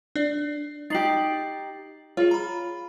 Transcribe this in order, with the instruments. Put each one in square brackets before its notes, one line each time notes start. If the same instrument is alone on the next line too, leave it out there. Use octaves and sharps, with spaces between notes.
[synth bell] D4 D5
[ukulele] D#4 G4 [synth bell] A6 C7 F#7
[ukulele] F4 [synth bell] G#4 C#5
[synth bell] A#5 B5